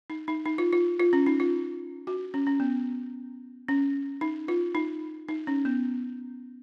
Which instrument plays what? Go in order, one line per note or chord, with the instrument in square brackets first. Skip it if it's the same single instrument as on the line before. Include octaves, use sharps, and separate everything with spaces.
[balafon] D#4
D#4
D#4
F4
F4
F4
C#4
D#4
F4
F#4
C#4
C#4
B3
C#4
D#4
F4
D#4
D#4
C#4
B3